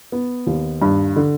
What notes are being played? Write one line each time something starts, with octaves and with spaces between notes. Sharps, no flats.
B3
D#2
G2
D3